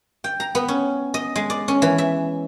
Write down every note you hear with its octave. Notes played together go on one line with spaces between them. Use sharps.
G5
A#5
B3
C#4
D#5
G#3
D5
C#4
E3
E5